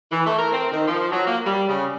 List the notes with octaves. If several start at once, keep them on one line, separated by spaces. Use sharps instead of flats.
E3
A3
A#4
C4
D#3
F3
F#3
A#3
G3
C#3